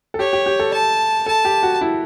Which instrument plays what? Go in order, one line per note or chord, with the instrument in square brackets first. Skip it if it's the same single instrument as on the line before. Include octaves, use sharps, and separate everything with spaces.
[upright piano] A4
[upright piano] G4 [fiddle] C#5
[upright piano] G4
G4
A4
[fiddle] A5
[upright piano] A4 [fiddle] A5
[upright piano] G4
F#4
E4